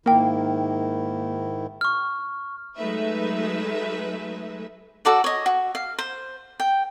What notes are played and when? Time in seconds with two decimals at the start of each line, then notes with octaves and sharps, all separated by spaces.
0.06 G#2 D#3 A#3 E4 A#4 G5
1.81 C#6 F6
2.76 F#3 G#3 A3 D#4 B4 E5
5.05 F#4 A4 D5 F#5
5.24 C#5 D#5
5.46 F#4
5.75 F5
5.99 C5
6.60 G5